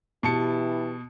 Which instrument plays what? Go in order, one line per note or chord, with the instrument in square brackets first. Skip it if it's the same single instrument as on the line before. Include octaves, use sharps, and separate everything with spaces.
[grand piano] B2 A5 C#7 [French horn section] E3 E4 G4